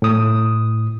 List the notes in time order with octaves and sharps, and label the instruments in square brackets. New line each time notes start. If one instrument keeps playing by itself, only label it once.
[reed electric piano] A2 D#6